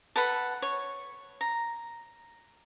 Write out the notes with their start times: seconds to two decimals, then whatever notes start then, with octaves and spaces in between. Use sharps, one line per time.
0.16 A4 B4 F#5 B5
0.62 C#5
1.41 A#5